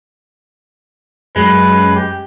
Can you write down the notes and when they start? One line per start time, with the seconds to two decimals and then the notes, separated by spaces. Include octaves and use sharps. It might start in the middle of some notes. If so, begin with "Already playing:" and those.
1.36 F#2 G#3 B4
1.95 G4